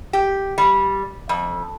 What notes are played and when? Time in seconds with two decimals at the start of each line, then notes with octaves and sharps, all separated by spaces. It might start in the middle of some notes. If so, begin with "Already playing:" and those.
0.13 G4
0.58 G3
1.29 F2